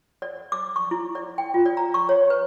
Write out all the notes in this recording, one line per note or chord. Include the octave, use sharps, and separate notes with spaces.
D5
D6
C#6
E4
D5
G5
F4
D5
A#5
C#6
C#5
B4